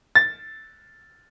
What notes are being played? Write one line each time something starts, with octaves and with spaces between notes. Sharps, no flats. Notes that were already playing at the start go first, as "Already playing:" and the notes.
A6